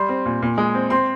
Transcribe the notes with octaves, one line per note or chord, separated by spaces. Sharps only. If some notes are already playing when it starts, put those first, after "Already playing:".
Already playing: G3 C6
C4
A#2
A#2
G#3
C4
C4 C6